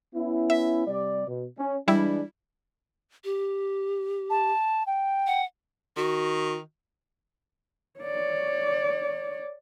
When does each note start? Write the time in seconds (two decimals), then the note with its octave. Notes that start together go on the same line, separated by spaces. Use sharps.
0.15 B3 C#4 E4
0.50 E5
0.87 C3 G3 D5
1.27 B2
1.58 C#4
1.88 E3 G3 G#3 D4 E4
3.24 G4
4.30 A5
4.87 G5
5.27 F#5
5.97 D#3 F#4
8.00 C#5 D5